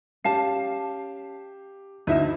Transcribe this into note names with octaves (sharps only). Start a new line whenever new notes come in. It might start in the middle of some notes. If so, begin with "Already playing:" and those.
C#4 G4 F5 A5 C7
D2 D#4 E4 E5